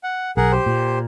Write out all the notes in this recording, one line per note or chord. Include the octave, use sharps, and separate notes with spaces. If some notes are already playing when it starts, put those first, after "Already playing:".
F#5
B1 G#4 A#4 F#5
G4 C5
A#2